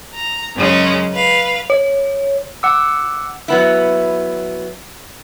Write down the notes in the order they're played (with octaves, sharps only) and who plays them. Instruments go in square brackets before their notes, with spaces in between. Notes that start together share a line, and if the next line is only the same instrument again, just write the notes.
[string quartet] A#5
F#2 C#3 G#3 C#4
B4 F5
[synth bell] C#5
[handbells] F#5 D6 E6
[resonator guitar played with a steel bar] F#3 B3 E4